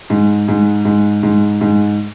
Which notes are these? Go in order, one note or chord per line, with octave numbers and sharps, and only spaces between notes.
G#2
G#2
G#2
G#2
G#2